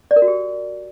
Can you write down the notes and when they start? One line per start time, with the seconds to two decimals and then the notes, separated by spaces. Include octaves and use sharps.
0.11 D5
0.16 A#4
0.22 F#4
0.28 G4